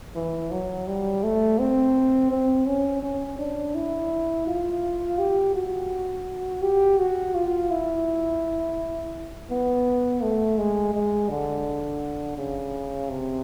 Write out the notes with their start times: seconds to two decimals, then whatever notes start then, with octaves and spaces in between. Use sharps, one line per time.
0.15 E3
0.51 F#3
0.87 G3
1.23 A3
1.59 C4
2.31 C4
2.66 C#4
3.03 C#4
3.39 D4
3.75 E4
4.47 F4
5.19 G4
5.55 F#4
6.63 G4
6.99 F#4
7.35 F4
7.71 E4
9.51 B3
10.22 A3
10.58 G#3
10.94 G#3
11.30 D3
12.37 C#3
13.09 C3